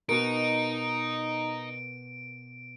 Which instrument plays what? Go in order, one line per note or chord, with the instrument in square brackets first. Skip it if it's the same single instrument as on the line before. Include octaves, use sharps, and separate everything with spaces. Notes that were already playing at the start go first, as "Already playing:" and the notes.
[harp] B2 A#4 [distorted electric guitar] D#4 [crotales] D7